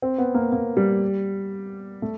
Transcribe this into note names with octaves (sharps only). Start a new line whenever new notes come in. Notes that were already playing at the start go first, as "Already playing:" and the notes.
C4
B3
A#3
A#3
G3
A3